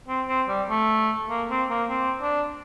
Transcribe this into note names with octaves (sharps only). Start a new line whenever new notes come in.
C4
C4
G3
A3
A#3
C4
A#3
C4
D4